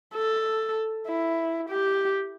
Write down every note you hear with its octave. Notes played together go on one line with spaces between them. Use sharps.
A4
E4
G4